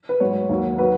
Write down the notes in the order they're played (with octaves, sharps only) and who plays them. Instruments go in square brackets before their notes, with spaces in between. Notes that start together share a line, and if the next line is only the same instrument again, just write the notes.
[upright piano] B4
G#2 F#3 C#5
D#2 D#3 F#3
F#3 B4